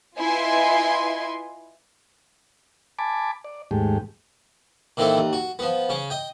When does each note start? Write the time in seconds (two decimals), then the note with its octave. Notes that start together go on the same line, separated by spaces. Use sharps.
0.18 E4 F4 B4 D#5 G#5 C6
2.99 G#5 A5 B5 D6
3.45 D5
3.71 D#2 G#2 G#3 A3 G4
4.97 A#2 D#3 E3 C4 A4
5.17 D#2
5.33 F#4
5.59 F3 B3
5.89 C#3 C#4
6.10 D#5 G5